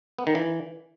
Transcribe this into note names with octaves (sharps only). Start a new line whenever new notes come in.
B3
D#3
E3